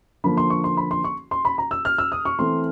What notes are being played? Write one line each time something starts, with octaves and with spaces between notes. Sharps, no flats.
D3 F3 A#3 B5
C6
C#6
C6
B5
C6
C#6
C6
B5
A#5
E6
F6
E6
D#6
C#6
E3 A3 C4 C6